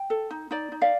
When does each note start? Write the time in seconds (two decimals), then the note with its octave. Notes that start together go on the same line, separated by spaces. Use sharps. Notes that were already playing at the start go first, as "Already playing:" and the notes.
Already playing: G5
0.10 A4
0.31 D#4
0.51 D#4 D5
0.72 D#4
0.81 D5 F5